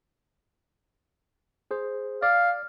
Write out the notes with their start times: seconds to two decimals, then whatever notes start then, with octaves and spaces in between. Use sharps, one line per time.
1.71 G#4 C5
2.22 D5 F5